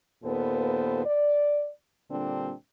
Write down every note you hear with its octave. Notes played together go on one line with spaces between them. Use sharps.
D#2 A#2 B3 A4 B4 C5
D5
A#2 D3 G3 C4 D4